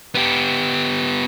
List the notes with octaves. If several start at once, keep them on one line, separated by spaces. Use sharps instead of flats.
B3 G4